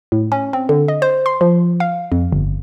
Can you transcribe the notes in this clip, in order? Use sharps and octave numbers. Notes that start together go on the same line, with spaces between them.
A2
C#4
C4
D3
D#5
C5
C6
F3
F5
F2
G1